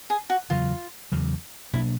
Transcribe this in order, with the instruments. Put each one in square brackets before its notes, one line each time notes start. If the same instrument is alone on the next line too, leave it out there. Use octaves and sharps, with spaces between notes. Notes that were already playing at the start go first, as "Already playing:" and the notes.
[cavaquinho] G#4
F#4
[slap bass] E2 C#3 F#3 [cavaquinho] F4
[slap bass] E2 C#3 F#3
[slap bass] B2 F#3 A#3 D4 [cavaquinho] E4